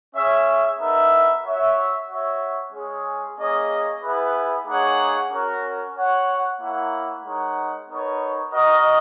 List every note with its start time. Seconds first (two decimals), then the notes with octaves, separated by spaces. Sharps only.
0.15 C#4 G#4 C#5 E5
0.79 B3 D#4 A#4 E5
1.43 F#4 C#5 E5
2.08 F#4 C#5 E5
2.72 G#3 C#4 G#4
3.38 A#3 C#4 G#4 D#5
4.02 B3 E4 G#4 B4
4.66 A#3 D#4 G#4 C#5 F#5
5.31 C#4 F#4 A#4
5.96 F#4 C#5 F#5
6.60 A#3 E4 A#4 C#5 F#5
7.24 G#3 D#4 A#4 C#5 F#5
7.89 B3 D#4 A#4 C#5
8.53 F#4 A#4 D#5